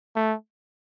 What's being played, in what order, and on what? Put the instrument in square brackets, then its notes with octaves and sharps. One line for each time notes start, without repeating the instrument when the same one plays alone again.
[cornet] A3